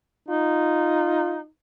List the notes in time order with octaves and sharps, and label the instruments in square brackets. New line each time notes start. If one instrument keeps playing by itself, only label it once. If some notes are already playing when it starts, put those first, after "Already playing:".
[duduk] D#4 [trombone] F4